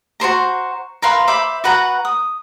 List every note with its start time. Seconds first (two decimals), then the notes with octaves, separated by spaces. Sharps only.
0.20 F#4 A#4 C5 A#5
1.02 A#4 B4 F5 C6
1.28 C5 E5 B5 D6
1.64 F#4 B4 F#5 A#5
2.05 D#6